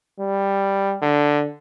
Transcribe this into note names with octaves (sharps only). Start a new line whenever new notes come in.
G3
D3